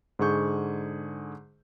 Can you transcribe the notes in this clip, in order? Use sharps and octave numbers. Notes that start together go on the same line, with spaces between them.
G#2 D3 G#4 C#6 G6